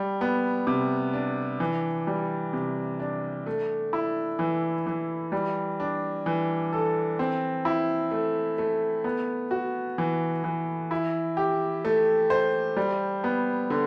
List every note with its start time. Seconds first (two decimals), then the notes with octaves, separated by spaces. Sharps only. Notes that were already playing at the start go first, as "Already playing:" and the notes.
Already playing: G3
0.21 B3
0.67 C3
1.13 D4
1.60 E3
2.07 G3
2.53 C3
2.99 D4
3.46 A3
3.93 E4
4.39 E3
4.86 E3
5.32 G3
5.80 D4
6.26 E3
6.73 A4
7.19 C4
7.65 E4
8.12 A3
8.58 A3
9.04 B3
9.51 F#4
9.98 E3
10.44 E3
10.91 E4
11.37 G4
11.85 A3
12.30 C5
12.77 G3
13.24 B3
13.70 D3